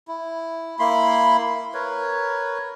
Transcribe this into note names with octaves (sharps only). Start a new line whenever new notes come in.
E4
A#3 E4 B5 C6
A#4 B4 C#5